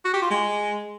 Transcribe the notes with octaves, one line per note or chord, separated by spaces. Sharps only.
F#4
G4
F4
G#3